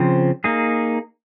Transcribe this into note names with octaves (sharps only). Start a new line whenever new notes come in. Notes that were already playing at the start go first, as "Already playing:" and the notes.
Already playing: C#3 F3 C4
A#3 D#4 G#4